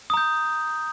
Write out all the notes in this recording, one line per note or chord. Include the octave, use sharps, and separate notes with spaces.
A#5 D#6 G6